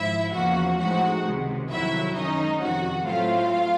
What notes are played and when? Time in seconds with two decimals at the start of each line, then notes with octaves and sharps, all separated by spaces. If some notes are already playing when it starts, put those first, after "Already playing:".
Already playing: G#1 G#2 F3 E4 E5
0.33 E2 C#3 F3 A#3 F#4 F#5
0.78 A2 F3 G#3 C4 D#4 F#4 F#5
1.24 C#2 C3 D#3 G#3
1.70 G1 F2 C3 D#3 F#3 E4 E5
2.15 F#2 D#3 G#3 C#4 D#4 D#5
2.61 F2 C3 D#3 F#4 F#5
3.07 A2 F#3 A3 C4 F4 F5